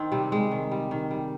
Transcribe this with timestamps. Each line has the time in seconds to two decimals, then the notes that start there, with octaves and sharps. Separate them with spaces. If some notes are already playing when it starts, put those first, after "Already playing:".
Already playing: D#3 C4 D#4
0.12 C3 G3
0.32 G3 G#3
0.51 D#3
0.72 G3
0.91 D#3
1.11 G3